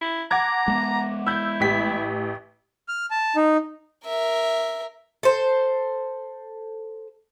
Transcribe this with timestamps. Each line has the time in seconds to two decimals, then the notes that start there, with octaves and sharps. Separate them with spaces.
0.01 E4
0.31 F#5 A#5 D6 G#6
0.68 G#3 A#3 B3
1.27 E4 E6 G6
1.60 A1 G4 B6
2.88 F6
3.11 A5
3.36 D#4
4.05 A#4 E5
5.23 A4 C5